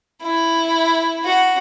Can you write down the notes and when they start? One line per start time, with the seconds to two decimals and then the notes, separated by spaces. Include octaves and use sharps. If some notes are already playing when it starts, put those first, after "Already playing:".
0.22 E4
1.25 F#4